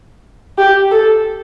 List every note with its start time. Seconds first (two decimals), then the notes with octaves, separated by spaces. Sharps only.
0.58 G4
0.91 A4